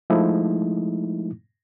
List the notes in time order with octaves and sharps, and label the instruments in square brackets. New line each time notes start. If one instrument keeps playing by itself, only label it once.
[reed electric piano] F3 G#3 A3 D#4 E4